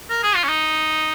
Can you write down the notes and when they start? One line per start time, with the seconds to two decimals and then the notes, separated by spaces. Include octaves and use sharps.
0.10 A#4
0.23 G#4
0.35 F4
0.44 C#4
0.49 D#4